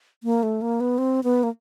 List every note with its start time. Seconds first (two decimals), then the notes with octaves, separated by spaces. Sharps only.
0.24 A#3
0.43 A3
0.62 A#3
0.80 B3
0.98 C4
1.24 B3
1.43 A#3